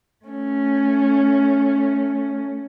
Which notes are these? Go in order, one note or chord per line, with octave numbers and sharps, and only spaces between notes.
A3 C#4